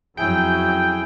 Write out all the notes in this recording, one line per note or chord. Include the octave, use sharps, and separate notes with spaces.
F2 F#3 C#4 E4 G#4 G5